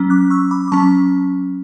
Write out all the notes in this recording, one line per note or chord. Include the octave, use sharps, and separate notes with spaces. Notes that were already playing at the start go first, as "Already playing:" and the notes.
Already playing: F#3 C#4
D6 F#6
C#6 E6
B5 D6
D6
F#3 C#4 A5 C#6